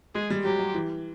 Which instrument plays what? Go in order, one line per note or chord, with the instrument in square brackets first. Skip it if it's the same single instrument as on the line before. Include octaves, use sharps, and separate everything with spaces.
[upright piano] G#3 [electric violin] G#4
[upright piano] G3
[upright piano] F#3 [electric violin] G4
[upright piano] F#3
E3